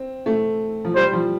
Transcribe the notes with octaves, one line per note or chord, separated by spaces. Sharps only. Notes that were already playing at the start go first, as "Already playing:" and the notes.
Already playing: C4
A3
F3
G3 C5
F3